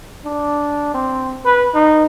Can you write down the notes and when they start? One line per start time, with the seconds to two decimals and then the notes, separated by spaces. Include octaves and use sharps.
0.24 D4
0.94 C4
1.45 B4
1.74 D#4